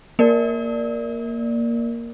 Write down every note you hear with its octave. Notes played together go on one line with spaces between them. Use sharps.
A#3 A#4 D5